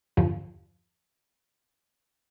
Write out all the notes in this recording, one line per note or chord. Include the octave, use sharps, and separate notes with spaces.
E2 G2 D3 F3